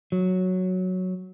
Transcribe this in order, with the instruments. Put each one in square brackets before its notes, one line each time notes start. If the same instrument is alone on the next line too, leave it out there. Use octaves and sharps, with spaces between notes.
[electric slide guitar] F#3